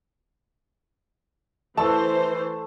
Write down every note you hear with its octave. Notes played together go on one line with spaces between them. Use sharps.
E3 A3 C5 A5 E6